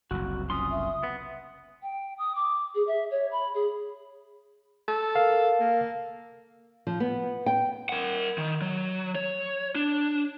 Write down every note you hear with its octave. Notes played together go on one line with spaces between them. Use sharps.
F#1 C2 F#4
C#4 F4 C6 D#6
E5
B3
G5
D#6
D6
G#4
E5
C#5
B5
G#4
A4
A#4 F5
A#3
F3
B3
G5
A#4 F#5
D#3
F#3
C#5
D4